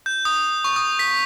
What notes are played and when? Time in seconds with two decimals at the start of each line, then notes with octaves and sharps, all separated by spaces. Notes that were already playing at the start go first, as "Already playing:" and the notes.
0.06 G6
0.25 D#6
0.64 C#6
0.76 D#6
0.99 B6